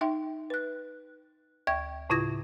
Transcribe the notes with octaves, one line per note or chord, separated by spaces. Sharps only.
D#4 E5 G5 C6
B4 F#6
D2 E5 G5 C#6 G#6
A2 C#3 E4 F4 G#6 A#6